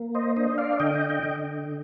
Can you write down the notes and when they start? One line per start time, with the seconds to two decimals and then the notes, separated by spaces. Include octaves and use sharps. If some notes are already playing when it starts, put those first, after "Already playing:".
Already playing: A#3
0.15 C5 D#5
0.36 D4 C5 D#5
0.58 D5 F5
0.80 D3 D#5 G5
1.09 D#5 G5
1.23 D3